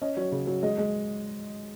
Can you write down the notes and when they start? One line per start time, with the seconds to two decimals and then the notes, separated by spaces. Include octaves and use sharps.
0.02 C#4 D#5
0.17 F#3 C#5
0.32 C#3
0.47 F#3
0.63 G#3 D#5
0.78 G#3